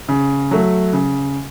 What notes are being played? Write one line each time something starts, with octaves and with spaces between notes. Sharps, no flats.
C#3
F#3 A3
C#3